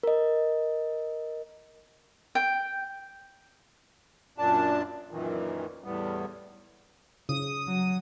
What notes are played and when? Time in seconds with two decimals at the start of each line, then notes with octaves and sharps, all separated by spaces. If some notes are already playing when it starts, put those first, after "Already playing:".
0.03 A#4 D#5
2.35 G5
4.38 F#2 A#2 D4 A5
5.11 F#2 A#2 D#3 E3
5.84 E2 A2 G3 B3
7.29 C#3 D#6
7.67 F#3